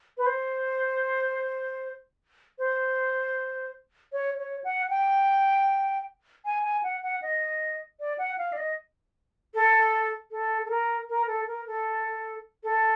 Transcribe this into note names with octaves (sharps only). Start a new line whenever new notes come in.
B4
C5
C5
C#5
C#5
F#5
G5
G#5
G#5
F#5
F#5
D#5
D5
F#5
F5
D5
D#5
A4
A4
A4
A#4
A#4
A4
A#4
A4
A4